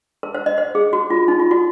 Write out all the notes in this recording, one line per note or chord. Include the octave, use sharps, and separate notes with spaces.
A#4
C5
D#5
C5
G#4
F#4
F4
D#4
F4
F#4